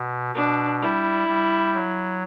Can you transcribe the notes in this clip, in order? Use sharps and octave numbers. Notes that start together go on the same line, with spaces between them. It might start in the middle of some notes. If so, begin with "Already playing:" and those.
Already playing: B2
B2 D4
G3 E4
G3
F#3